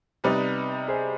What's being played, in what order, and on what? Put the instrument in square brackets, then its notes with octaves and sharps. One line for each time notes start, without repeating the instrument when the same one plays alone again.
[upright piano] C3 G3 B3 D#4 [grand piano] B4 D5
[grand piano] G#4 C5